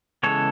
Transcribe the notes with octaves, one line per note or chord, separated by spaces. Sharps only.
C#3 E3 G#3 B3 A4 C#5